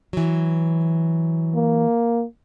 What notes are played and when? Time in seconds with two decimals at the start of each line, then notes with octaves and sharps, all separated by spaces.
0.13 E3 F#3
1.55 A#3